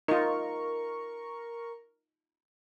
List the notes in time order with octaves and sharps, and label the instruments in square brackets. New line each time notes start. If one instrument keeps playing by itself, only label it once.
[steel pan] D#4 F4 [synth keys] A#4 C#6